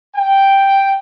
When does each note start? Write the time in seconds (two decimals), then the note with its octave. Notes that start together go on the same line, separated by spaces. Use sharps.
0.15 G5